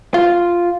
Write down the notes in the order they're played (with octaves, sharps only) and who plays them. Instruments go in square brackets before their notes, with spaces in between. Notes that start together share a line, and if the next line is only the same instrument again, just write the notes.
[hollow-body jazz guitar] F4